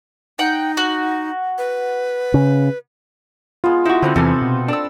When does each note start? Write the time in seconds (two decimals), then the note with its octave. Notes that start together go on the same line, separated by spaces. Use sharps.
0.39 D#4 F#5 G5
0.77 F#4
1.58 B4
2.34 C#3
3.64 G#3 B3 F4
3.85 D#4 E4 F#4
4.02 D3 C4 B4 F#5
4.16 E2 C3 E3 A4 G#5 A5
4.42 B2
4.68 D4 A4 E6